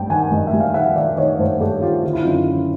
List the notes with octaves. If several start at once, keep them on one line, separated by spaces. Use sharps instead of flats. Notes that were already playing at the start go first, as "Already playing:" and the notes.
Already playing: G2 G3 G5
D#3 F#5 G#5
G2 D#5
E5
G3
F5
D#3 E5 F#5
D#3 D5 E5
D#3 C#5 D#5
G2 C5 D5
G2 G4 A4
D#3 F4 G4
D3 F4
E4
F#2 D#4 F4
D3